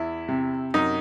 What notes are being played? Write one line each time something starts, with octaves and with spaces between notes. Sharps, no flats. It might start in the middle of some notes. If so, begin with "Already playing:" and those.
Already playing: E2 E4
C3
F#2 D#4